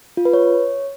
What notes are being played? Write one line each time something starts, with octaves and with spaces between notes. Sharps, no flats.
F4
B4
C#5